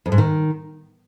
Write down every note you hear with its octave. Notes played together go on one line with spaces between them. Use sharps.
F2
G#2
D#3